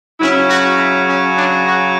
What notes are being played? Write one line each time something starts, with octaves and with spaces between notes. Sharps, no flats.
C#3 F#3 C#4 E4
F#4
E4
C#4
D4
F#4